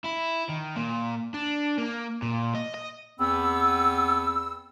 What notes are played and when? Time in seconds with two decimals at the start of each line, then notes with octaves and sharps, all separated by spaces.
0.04 E4
0.49 D#3
0.76 A#2
1.34 D4
1.78 A#3
2.22 A#2
2.55 D#5
2.74 D#5
3.19 E2 B3 C4 E6